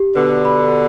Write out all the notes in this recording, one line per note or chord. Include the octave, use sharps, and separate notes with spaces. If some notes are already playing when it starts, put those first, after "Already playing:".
Already playing: G4
B2 D3 B4
B5